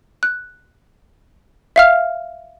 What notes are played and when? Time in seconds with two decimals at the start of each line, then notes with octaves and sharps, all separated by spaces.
0.23 F#6
1.76 E5 F5 F6